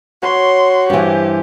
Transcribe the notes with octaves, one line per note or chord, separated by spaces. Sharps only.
F#4 C#5 B5 C6
G2 E3 G4 C5 G#5